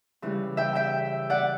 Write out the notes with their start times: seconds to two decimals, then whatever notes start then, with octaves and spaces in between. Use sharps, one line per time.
0.22 C#3 E3 G3
0.57 E5 G5
0.75 E5 G5
1.30 D5 F#5